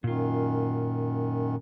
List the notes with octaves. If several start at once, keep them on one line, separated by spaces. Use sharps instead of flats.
F#2 A#2 D#3 F4